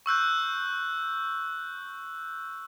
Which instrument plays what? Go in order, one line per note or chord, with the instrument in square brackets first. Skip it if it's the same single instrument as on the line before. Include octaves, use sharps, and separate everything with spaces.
[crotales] C#6 E6 F#6 G6